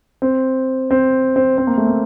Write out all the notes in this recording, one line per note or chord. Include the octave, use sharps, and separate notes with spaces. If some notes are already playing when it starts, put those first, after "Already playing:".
C4
C4
C4
C4
A#3
A3
A#3